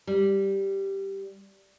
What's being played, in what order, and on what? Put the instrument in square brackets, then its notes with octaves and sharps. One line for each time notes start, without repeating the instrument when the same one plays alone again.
[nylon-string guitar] G3